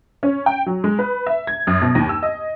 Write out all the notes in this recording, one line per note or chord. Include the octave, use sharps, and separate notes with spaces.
C#4
G5
F#3
G#3
B4
E5
G#6
F#2
B2
D#2
E6
D#5